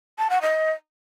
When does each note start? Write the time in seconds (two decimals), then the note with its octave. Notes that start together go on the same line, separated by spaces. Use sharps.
0.18 A5
0.30 F#5
0.41 D#5